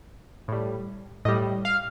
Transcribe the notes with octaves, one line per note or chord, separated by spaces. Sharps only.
A2 G3
A2 G3 D#5
F5